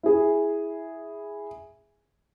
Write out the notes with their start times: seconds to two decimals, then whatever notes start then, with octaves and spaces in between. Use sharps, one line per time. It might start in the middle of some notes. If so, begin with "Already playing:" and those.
0.03 E4 G#4